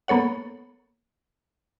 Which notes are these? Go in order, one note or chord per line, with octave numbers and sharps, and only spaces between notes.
A#3 B3 A4 C#5 F#5